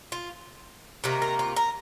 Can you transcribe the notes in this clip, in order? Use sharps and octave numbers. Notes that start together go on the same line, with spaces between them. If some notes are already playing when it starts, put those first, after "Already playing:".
F4
C3 D#3 A#3 A#4
A#4
F4
A#4